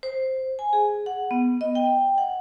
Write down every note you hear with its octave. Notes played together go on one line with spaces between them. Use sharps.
C5
G#5
G#4
F#5
B3
D#5
G5
F#5